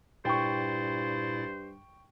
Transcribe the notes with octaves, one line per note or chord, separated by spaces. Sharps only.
G2 A#2 E4 C5 G5 C#6 A6